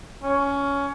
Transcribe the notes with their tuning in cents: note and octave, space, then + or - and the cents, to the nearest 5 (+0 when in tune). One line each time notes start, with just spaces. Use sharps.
C#4 +15